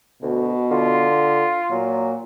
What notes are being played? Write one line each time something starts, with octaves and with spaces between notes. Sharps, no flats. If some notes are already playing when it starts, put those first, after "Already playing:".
D2 B2
D3 F4
A#2 F#3